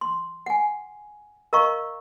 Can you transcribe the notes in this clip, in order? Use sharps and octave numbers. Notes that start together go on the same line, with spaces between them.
C6
F#5 G#5
A#4 D#5 F5 A#5 C#6